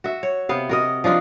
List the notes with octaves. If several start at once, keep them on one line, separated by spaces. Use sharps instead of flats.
F#4 E5
C#5
C3 B3 F5
F#4 A#4 D#5
F3 D4 D#4 F4